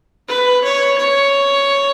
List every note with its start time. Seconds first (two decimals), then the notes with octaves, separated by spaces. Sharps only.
0.28 B4
0.64 C#5
0.98 C#5